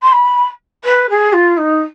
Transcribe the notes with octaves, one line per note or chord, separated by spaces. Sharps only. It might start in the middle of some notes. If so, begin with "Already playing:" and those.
C6
B5
B4
G#4
F4
D#4